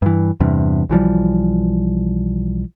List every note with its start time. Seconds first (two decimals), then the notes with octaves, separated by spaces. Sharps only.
0.02 G2 E3
0.40 E2 G2 C3
0.90 B1 E3 F3 G3